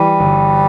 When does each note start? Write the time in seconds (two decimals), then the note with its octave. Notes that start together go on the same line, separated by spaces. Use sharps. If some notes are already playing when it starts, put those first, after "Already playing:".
Already playing: E3 G3
0.20 G1